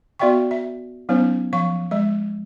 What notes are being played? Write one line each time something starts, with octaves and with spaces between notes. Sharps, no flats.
B3 F#4 D5 E5 G5 C#6
E5
F#3 B3 C#4 D#4 C5
F3 F5 C#6
G#3 E5